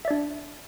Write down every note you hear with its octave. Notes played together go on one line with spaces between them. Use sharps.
D4 D5 E5